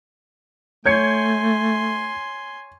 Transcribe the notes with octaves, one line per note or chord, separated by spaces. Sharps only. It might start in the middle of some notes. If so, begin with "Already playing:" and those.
A3 C#5 G#5 C6 G6 G#6 C#7